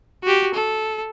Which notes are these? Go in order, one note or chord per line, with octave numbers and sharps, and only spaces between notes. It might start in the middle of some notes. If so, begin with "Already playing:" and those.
F#4 G4
A4